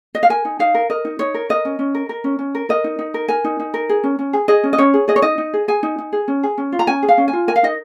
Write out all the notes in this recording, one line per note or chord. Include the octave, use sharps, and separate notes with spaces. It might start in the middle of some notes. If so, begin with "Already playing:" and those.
D#5
F5
A#4 G#5
D#4
D#4 F5
A#4
A#4 D#5
D#4
D#4 C#5
A#4
A#4 D#5
C#4
C#4
A#4
A#4
C#4
C#4
A#4
A#4 D#5
D#4
D#4
A#4
A#4 G#5
D#4
D#4
A#4
G#4
C#4
C#4
G#4
G#4 D#5
C#4
D#5
C#4 C#5
G#4
G#4 D#5
C#5
D#4 D#5
D#4
G#4
G#4 G#5
D#4
D#4
G#4
C#4
G#4
C#4
F4
A#5
C#4 G#5
G#4
F5
C#4
G#5
F4
A#4 G#5
F5
D#4 D#5